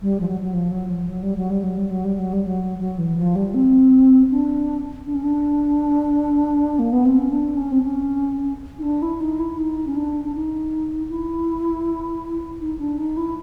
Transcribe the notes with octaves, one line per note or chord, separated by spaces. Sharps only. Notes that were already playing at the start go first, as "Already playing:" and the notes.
G3
F3
F#3
F#3
F3
F#3
F3
F#3
G3
F#3
G3
F#3
G3
F#3
G3
F#3
G3
F#3
F#3
E3
F3
G3
C4
D4
D4
C#4
D4
A#3
B3
C4
C#4
D4
C#4
C4
C#4
D#4
D4
E4
D#4
E4
D#4
C#4
D4
D4
D#4
E4
D#4
D4
D#4
E4